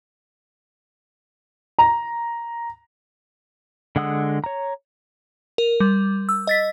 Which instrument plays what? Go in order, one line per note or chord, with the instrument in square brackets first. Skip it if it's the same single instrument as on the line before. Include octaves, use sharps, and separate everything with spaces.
[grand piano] A#5
[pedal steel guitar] D3 G#3 F#5 D#6 E6
C#5 A#5
[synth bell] A#4
G3
E6
D#5 A6 B6